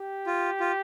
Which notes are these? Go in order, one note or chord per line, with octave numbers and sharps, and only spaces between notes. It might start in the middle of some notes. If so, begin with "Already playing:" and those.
Already playing: G4
F4
F4